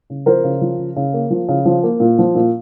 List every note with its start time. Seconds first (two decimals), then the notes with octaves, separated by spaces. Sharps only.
0.10 C#3
0.26 F3 A#4 C5
0.44 C#3
0.61 F3
0.78 C#3
0.96 C#3
1.14 A#3
1.30 F3
1.48 C#3
1.65 F3
1.83 A#3
2.00 A#2
2.19 F3
2.35 A#2